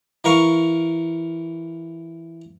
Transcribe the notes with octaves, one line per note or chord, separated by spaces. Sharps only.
E3 A#4 F5 C#6